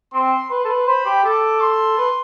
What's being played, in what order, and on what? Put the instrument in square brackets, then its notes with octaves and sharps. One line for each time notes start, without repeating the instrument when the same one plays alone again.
[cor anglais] C4 [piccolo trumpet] C6
[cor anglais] B4 [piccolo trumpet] C6
[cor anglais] A4
B4
[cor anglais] C5 [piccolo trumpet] B5
[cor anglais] G4
[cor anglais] A4 [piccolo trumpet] D6
[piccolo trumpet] C6
[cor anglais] B4